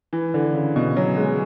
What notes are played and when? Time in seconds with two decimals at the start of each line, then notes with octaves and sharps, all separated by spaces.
0.13 E3
0.34 D3
0.54 C#3
0.76 B2
0.96 F#3
1.16 G#3